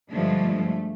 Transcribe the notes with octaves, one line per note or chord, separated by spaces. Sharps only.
G2 D3 F3 G#3 A3